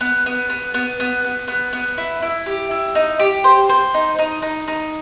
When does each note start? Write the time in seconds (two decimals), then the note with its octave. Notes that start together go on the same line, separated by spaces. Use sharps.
0.01 B3
0.26 B3
0.50 B3
0.74 B3
1.00 B3
1.24 B3
1.48 B3
1.73 B3
1.98 E4
2.23 E4
2.46 G4
2.71 E4
2.95 D#4
3.19 G4
3.44 C5
3.70 C5
3.94 D#4
4.19 D#4
4.42 D#4
4.68 D#4